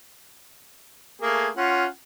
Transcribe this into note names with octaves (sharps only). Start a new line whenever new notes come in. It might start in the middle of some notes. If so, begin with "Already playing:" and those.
A3 A#3 G#4
C#4 F4 F#5